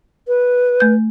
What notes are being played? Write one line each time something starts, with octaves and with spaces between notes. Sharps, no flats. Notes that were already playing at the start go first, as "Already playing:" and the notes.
B4
A3 G6